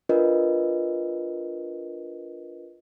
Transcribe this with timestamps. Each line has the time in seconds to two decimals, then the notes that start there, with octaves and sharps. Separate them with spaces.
0.09 D4 F4 A#4 B4 D#5